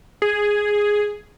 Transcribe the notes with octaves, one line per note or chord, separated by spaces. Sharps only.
G#4